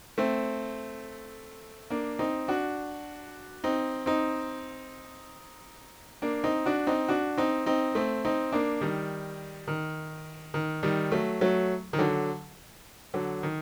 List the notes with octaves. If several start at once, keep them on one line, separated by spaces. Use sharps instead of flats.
A3 C4
A#3 D4
C4 D#4
D4 F#4
C4 D#4
C4 D#4
A#3 D4
C4 D#4
D4 F#4
C4 D#4
D4 F#4
C4 D#4
C4 D#4
A3 C4
C4 D#4
A#3 D4
D#3 G3
D#3
D#3
D#3 G3
F#3 A3
F#3 A3
D#3
D3 F#3
D3 F#3
D#3